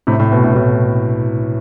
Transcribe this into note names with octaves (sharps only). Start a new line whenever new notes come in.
A2 C3
A2
B2
A2
B2
A2